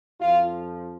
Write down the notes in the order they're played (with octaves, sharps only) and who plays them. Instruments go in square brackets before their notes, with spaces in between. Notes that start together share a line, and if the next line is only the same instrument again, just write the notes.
[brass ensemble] F2 F3 F4